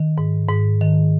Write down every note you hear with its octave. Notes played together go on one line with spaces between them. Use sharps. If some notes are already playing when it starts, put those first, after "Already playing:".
Already playing: D#3
G#2
G#2
D#3